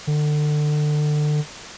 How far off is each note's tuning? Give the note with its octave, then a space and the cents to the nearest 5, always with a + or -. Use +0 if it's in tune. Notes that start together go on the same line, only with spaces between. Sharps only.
D3 +30